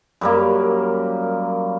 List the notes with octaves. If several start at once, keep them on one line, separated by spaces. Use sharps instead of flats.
F#2 G3 A#3